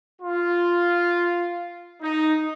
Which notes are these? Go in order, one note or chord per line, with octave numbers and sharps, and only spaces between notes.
F4
D#4